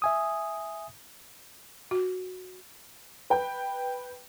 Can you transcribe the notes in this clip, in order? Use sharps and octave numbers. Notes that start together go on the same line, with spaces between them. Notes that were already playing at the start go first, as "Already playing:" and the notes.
E5 G#5 D#6
F#4
B4 G5